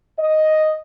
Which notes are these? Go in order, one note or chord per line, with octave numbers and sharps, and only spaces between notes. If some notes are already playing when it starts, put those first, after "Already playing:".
D#5